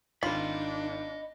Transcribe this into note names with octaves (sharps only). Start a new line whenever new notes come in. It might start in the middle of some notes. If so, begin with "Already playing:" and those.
G#1 D#3 D4 F4 D#5 B5